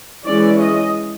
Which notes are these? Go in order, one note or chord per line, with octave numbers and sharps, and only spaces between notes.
E3 G#3 C#4 D5
D#5